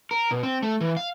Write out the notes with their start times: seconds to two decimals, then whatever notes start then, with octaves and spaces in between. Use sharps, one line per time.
0.11 A#4
0.31 B2
0.43 C4
0.63 A3
0.81 E3
0.97 F5